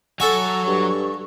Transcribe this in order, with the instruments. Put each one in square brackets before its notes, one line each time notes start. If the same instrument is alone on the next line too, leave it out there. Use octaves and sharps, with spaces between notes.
[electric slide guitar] F#3 F#5 [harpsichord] A4 E5 G#5 [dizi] C#6
[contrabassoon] G2